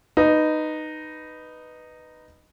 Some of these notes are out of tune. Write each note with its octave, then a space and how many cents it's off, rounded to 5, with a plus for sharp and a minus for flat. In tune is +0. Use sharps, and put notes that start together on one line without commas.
D#4 -10 B4 +0